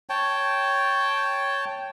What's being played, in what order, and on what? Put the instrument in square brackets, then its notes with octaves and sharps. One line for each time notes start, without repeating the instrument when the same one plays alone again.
[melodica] C#5 G5 A5